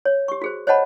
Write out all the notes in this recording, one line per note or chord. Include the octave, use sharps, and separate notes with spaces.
C#5
G4 C#6
F#4 G#4 C5
C5 C#5 D#5 F#5 A5 B5